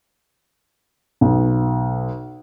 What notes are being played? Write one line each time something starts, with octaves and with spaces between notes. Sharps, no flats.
B1